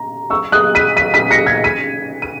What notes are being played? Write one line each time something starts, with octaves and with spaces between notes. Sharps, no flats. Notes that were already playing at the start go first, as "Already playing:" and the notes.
Already playing: A#5
C#6 E6
D#6 F#6
B6 D#7
B6 D#7
B6 D#7
A#6 C#7
G#6 B6
B6 D#7
D#7